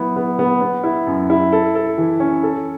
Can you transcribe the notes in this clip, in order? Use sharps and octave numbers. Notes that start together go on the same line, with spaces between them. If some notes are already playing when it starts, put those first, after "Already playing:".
Already playing: F#3 B3 E4
B3
B3
B3
E4
F#2
E4
A4
A4
E3
C#4
A4